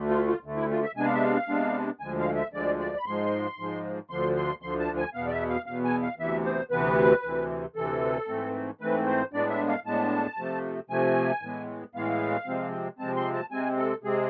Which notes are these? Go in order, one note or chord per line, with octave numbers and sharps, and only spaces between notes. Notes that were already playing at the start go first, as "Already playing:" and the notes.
Already playing: D2 D3 A3
F4
F4
D2 D3 A3
E4
F4
E5
C3 G#3 B3 D4 G#5
F5
E5
F5
C3 G#3 B3 D4
D2 D3 F3 G#3 G#5
F5
E5
D2 D3 F3 G#3 D5
D5
B5
G#2 F3 G#3 C6
G#2 F3 G#3
D2 D3 F3 C6
C6
D2 D3 F3 C6
A5
G#5
E2 B2 B3 F5
D5
E5
F5
E2 B2 B3 F5
G#5
F5
D2 C3 E3 B3 E5
C5
D2 C3 E3 B3 B4
D2 C3 E3
D2 C3 E3 A4
G#2 E3 A3 C4
G#2 E3 A3 C4 B4
C5
A2 G#3 B3 D4 D5
E5
F5
A2 G#3 B3 D4 A5
C3 F3 A3
C3 F3 A3 G#5
A2 E3 G#3 B3
A2 E3 G#3 B3 F5
C3 F3 G#3 C4
C3 F3 G#3 C4 A5
C6
A5
C3 G#3 C4 G#5
A4
C3 G#3 C4 G#4